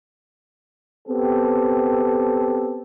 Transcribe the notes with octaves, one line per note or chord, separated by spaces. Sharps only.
B3 C4 G4 A4